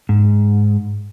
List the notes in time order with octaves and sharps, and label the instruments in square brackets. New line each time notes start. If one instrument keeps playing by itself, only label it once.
[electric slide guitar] G#2